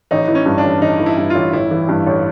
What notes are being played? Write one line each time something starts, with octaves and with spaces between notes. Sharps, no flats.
A1 D#4
E3
C#4
G2
D4
A1
A1 D#4
E3
E4
G2
F4
A1
A1 E4
E3
G2
A1